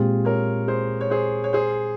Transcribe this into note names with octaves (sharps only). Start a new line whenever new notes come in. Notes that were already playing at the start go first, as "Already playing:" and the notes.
Already playing: A#2 G#3 C4 F4 G4 G#4
A#4 C#5
G#4 C5
C#5
G#4 C5
C#5
G#4 C5